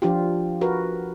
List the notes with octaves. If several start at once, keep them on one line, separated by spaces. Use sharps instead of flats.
F3 D4 F4 G4
F#4 A#4 B4